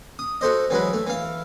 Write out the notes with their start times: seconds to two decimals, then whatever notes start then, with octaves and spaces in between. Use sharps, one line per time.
0.19 D#6
0.41 F#4 A4 C5 D#5
0.70 E3 F#3 G#3 B4
0.93 A3
1.07 E3 F5